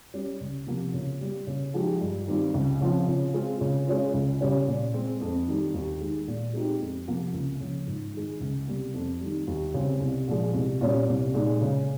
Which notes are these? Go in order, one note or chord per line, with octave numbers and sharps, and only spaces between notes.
G3 C#4
C#2
C3 F3 A#3
C#3
G3 A#3
C#3
F3 G#3 D#4 G4
G2
D#3 G3 C4 F4
C#2
C#3 F3 C4 F4
C#3
G#3 C4 F4
C#3
G#3 C#4 F4
C#2
C#3 G3 C#4
A#2
G#3 C4
F2
D#3 G3
D#2
D#3 G#3
A#2
G#3 C4 D#4 G4
F2
C3 F3 A#3 F4
C#2
C#3 F3
G#2
D#3 G#3
C#2
C3 G3 A#3
F2
D#3 G3
D#2
C#3 G3 C4
C2
A#2 F3 G#3
C2
A#2 G3 C#4
C2
A#2 G#3 D#4
C#3